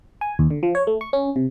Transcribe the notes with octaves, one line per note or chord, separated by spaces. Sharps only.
G#5
D#2
D3
F3
C#5
A3
C#6
C#4
C3